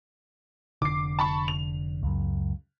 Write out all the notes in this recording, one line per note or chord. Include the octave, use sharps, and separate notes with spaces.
F1 B1 D3 D6 C7
A5 B5 C#6
F7
C#2 F#2